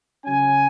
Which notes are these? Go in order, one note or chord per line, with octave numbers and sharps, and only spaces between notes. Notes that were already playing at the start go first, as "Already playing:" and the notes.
C#3 F#3 C#4 G#5